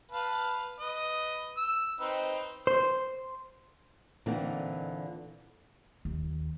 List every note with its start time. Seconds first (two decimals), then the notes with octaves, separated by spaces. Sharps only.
0.12 B4 F5 A5
0.80 B4 D#5
1.58 E6
2.01 C4 D#4 B4
2.67 C5
4.26 A#2 D3 E3 C4 D#4
6.05 D#2